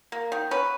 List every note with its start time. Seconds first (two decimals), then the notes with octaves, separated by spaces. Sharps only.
0.12 A#3
0.32 D#3
0.51 C#4 B4